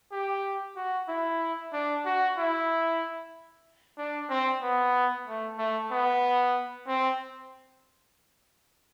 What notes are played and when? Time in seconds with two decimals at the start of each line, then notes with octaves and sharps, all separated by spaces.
0.12 G4
0.76 F#4
1.08 E4
1.73 D4
2.05 F#4
2.38 E4
3.98 D4
4.30 C4
4.62 B3
5.27 A3
5.58 A3
5.91 B3
6.87 C4